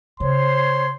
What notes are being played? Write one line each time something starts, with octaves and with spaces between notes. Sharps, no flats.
C#3 C5 C#5 C6